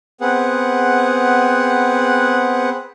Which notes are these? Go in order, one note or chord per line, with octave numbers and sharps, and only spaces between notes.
B3 C4 G#4 F#5